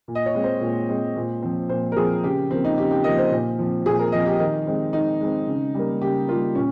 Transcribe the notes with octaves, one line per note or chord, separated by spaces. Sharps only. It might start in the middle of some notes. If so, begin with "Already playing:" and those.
A#2
D#5
C#5
G#3 C4
C5
A#2
G#3 C4
A#2
F3 C4
A#2 C5
A#4
F3 C4 G#4
C#3 G4
F3 A#3 C4
D#4
C#3 G4
G4
F3 A#3 D#5
C5
A#2
F3 C4
A#2 G#4
A#4
F3 C4 D#5
G4
D#3 D#4
G#3 C4
D#3 D#4
G#3 C4
C#3
G3 A#3
C#3 G4
G3 A#3 F4
A#2 C#4